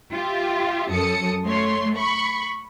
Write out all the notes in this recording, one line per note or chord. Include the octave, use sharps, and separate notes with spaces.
F4 G4 E5
F#2 A4 D#6 C#7
A3 C#5 C6
B5 C#6